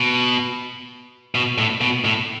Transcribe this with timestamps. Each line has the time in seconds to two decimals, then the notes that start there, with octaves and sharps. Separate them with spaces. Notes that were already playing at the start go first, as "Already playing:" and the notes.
Already playing: B2
1.35 B2
1.58 A2
1.81 B2
2.05 A2